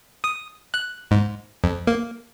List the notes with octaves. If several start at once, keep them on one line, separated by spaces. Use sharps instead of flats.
D#6
F#6
G#2
F2
A#3